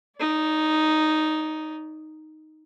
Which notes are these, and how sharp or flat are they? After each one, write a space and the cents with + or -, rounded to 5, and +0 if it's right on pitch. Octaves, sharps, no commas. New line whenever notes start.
D#4 +0 D5 -45